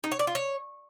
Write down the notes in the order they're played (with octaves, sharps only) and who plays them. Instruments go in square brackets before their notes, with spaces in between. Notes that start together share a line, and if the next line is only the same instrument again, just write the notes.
[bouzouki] D#4
C#5
D5
F4
C#5